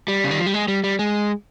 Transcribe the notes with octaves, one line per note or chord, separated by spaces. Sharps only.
G3
C#3
D#3
F3
G3
G#3
G3
G3
G#3